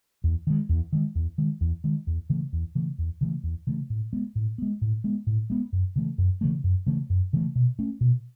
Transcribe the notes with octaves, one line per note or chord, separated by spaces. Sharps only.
E2
D#3 G#3
E2
D#3 G#3
E2
D#3 G#3
E2
D#3 G#3
E2
C#3 E3 A3
E2
C#3 E3 A3
E2
C#3 E3 A3
E2
C#3 E3 A3
A2
G#3 B3
A2
G#3 B3
A2
G#3 B3
A2
G#3 B3
F#2
C#3 E3 A3
F#2
C#3 E3 A3
F#2
C#3 E3 A3
F#2
C#3 E3 A3
B2
A3 C#4
B2